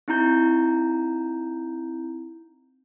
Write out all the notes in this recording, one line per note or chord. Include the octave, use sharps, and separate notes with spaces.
C4 D#4 E4 A#5 G6